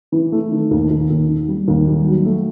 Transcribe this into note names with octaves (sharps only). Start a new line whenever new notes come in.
E3
A3
D#3
D#2
D#2
D#2
D#3
G3
D#2
G3
F#3
A3